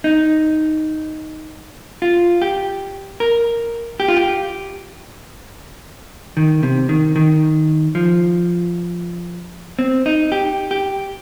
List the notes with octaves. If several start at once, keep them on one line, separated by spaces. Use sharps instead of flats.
D#4
F4
G4
A#4
G4
F4
G4
D#3
C3
D#3
D#3
F3
C4
D#4
G4
G4